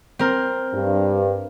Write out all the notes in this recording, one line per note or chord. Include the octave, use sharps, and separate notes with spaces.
C4 A#4
G2